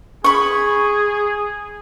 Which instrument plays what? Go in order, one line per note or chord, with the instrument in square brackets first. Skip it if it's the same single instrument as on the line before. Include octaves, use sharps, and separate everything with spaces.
[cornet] G#4 [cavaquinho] B5 C#6